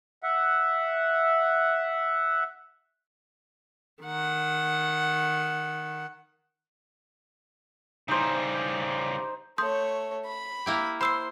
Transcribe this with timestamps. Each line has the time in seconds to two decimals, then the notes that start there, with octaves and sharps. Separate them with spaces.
0.23 E5 F#5
4.03 D#3 F#5
8.08 C#3 G3 D#4 C5
9.58 A3 C#5 C6 D#6 G6
10.26 B5
10.66 A#3 E4 G4
11.01 C5 B5 C6 E6 C7